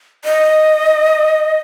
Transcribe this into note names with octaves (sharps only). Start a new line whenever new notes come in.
D#5